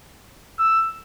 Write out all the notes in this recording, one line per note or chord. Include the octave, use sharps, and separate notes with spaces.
E6